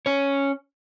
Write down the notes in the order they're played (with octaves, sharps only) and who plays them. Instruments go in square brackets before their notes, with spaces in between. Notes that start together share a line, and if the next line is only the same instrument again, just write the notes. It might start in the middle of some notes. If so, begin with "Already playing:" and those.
[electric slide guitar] C#4 C#5